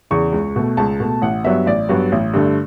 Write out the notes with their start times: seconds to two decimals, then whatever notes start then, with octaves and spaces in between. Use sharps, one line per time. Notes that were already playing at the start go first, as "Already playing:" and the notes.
0.11 E2 C#3 C#6
0.32 C#2
0.56 B2 A3
0.77 C#2 A5
1.00 B2 A3
1.22 A1 F#5
1.44 G2 F#3 B3 E5
1.66 A1 D5
1.89 G2 F#3 B3
2.12 A1
2.34 G2 D3 A3